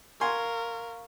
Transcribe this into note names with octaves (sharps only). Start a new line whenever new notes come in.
A#4 F5 G#5 C6 C#6